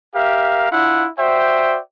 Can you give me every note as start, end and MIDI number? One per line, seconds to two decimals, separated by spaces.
0.15 0.68 67
0.15 0.68 70
0.15 0.68 76
0.15 0.68 77
0.71 1.07 62
0.71 1.07 64
0.71 1.07 65
0.71 1.07 76
0.71 1.07 78
1.19 1.79 66
1.19 1.79 72
1.19 1.79 74
1.19 1.79 76
1.19 1.79 79